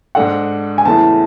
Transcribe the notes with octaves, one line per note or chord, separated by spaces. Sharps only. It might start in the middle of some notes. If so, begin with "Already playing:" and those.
G#2 G#3 D4 A4 F#5
G#5
E2 C#3 E3 A3 E4 A5